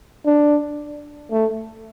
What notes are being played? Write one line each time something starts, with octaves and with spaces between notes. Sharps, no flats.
D4
A3